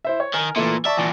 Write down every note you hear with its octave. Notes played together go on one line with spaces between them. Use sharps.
E4 C5 E5
C#5
D#3 A#4 G#5
A#2 E3 A3 E4
D5 E5 A5 C#6
E2 A#2